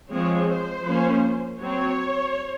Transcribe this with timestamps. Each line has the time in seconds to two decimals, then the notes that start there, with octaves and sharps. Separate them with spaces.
0.12 F3 G#3 C4 C#5
0.49 C5
0.86 F3 A#3 C#4
1.59 F#3 C4 C#5